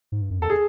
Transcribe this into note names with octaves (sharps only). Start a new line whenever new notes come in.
G#2
G2
F#2
E2 A4
G#4